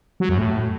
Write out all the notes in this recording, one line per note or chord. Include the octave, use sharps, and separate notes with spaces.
F#3
F#2
A2